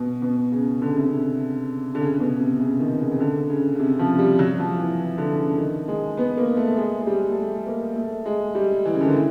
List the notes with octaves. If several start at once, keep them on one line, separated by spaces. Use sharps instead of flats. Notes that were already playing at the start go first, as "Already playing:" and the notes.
Already playing: B2
B2
C#3
D3
C#3
C3
C#3
D3
C#3
B2
C3
C#3
D#3
C#3
C#3
D3
C#3
C#3
C3
F3
G3
F#3
F3
E3
D3
C#3
D#3
G#3
B3
A#3
A3
G#3
G#3
G3
A3
G#3
A#3
A3
G#3
G3
E3
C#3
D3
D#3
E3